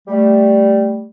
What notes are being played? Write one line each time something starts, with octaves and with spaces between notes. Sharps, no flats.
G3 A3